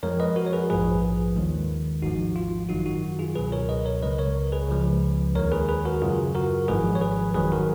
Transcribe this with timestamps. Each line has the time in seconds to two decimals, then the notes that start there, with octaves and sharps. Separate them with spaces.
0.03 F2 F3 G#3 A#4 C#5
0.20 B4 D#5
0.36 F#4 A#4
0.46 C#5
0.53 G#4 B4
0.70 A#1 G#2 F3 G#4 B4
1.36 D#2 D#3 G#3
2.02 G#1 G#2 F3 D#4 F#4
2.36 F4
2.69 F#2 D#3 F#3 D#4 F#4
2.86 D#4 F#4
3.19 F4 G#4
3.35 C#2 B2 F#3 G#4 B4
3.52 A#4 C#5
3.69 B4 D#5
3.86 A#4 C#5
4.03 C#2 C#3 G#3 B4 D#5
4.18 A#4 C#5
4.52 G#4 B4
4.69 C#2 C#3 F3 G#3
5.35 D#2 D#3 G#3 A#4 C#5
5.52 G#4 B4
5.68 G#4 B4
5.85 F#4 A#4
6.02 F#2 C#3 F#3 F4 G#4
6.35 F#4 A#4
6.68 G#1 G#2 F3 G#3 G#4 B4
6.95 C#5
7.01 G#4 B4
7.34 F2 D#3 F#3 G#4 B4
7.52 F#4 A#4